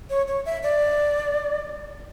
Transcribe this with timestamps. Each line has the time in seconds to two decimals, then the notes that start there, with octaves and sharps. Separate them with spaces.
0.10 C#5
0.28 C#5
0.46 E5
0.63 D5